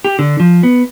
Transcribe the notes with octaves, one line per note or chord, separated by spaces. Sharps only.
G4
D3
F3
B3